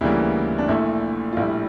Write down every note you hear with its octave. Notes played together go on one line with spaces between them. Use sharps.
D2 C#3 E3 G3 A#3 E4
D4
A#1 A#2 A3 E4
F4
A#1 A2 G3 E4